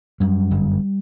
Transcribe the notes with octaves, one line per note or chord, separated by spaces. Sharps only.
F#2 G3
G1